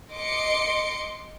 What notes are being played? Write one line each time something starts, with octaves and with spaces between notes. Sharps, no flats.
D#5 C6 D6 C#7